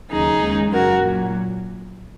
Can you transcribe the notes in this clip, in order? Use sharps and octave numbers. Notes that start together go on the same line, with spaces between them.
D#2 C#3 F#3 D#4 G#4
D#2 C#3 G#3
F#2 F#3 F#4 A#4
A#2 F#3